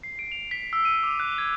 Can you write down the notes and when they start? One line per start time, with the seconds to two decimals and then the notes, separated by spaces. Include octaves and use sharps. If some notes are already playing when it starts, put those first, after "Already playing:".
0.03 C7
0.19 D7
0.32 F7
0.51 B6
0.73 E6
0.85 D#7
1.03 D6
1.20 F#6
1.38 G#6